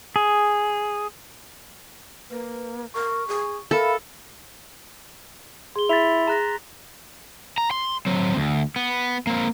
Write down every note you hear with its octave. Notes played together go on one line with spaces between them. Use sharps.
G#4
A#3 B4
A#4 C#6
G#4
A4 A#4 E5 F5 B5
G#4 C6 G7
E4 A6 B6 F7
G#4 A#5 F#6 A#6
A#5
C6
F#3 C4
D2
B3
A#3 C4